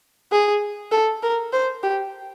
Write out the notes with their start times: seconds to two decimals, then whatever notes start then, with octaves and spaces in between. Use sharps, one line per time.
0.32 G#4
0.92 A4
1.23 A#4
1.53 C5
1.83 G4